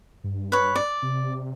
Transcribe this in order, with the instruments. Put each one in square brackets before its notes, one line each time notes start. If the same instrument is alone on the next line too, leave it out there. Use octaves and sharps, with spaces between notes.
[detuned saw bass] G2
[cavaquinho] B4 C#5
D5
[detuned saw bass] C3